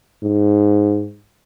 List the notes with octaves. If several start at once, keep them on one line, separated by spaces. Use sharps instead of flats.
G#2